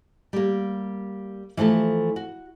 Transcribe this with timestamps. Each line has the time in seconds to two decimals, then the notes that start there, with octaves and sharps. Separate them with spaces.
0.33 G3 A#3
1.57 E3 F3 A3 A4
2.16 F#4